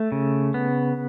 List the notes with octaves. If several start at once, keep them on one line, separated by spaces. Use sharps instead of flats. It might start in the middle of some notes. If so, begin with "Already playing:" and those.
Already playing: A3
C#3
B3